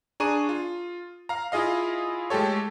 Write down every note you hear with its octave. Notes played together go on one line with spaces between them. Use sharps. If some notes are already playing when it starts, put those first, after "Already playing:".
D4 G#4 A#5 C#6 D#7
F4
F5 A#5
E4 F4 G#4 D#5 F5
G#3 A3 G4 A4 C#5